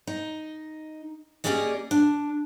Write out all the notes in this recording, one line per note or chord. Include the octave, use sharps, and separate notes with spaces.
D#4
A#3 C#4 G4 G#4 D5 D#5
D4